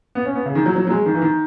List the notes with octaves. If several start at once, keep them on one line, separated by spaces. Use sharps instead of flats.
B3
C#4
B3
C#3
D#3
F#3
F#3
F#3
G#3
D#3
E3
D#3